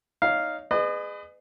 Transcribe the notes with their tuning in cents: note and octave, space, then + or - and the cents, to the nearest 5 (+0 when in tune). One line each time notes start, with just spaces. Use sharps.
D#4 +0 C#5 +30 F5 -5
G#4 +0 B4 +30 D#5 -40